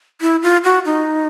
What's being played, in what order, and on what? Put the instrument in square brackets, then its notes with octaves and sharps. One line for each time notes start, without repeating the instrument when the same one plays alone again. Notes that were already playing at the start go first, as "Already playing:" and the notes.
[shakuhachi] E4
F4
F#4
D#4